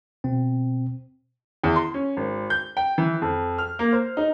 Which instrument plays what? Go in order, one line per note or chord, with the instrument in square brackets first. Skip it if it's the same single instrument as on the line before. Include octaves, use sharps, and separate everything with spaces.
[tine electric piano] B2 C4
[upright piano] E2
C6
C#4
G#1
G6
G5
E3
F2
F6
A#3
C5
D#4